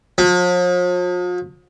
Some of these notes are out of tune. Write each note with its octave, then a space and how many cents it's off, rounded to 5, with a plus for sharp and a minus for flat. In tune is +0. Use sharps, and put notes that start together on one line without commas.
F3 +45